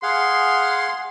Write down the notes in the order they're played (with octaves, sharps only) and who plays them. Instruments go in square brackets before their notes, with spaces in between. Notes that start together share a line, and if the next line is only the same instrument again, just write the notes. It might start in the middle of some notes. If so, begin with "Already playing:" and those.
[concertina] G#4 F5 F#5 [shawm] C6